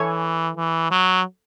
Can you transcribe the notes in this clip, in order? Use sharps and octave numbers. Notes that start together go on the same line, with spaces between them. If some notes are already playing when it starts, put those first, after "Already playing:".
Already playing: E3 A4 C#5 E5 G#5 C#6
E3
F#3